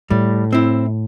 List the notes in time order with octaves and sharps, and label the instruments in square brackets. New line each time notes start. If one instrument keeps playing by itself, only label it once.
[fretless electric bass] A2 [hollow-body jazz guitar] G3
[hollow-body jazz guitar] C4 E4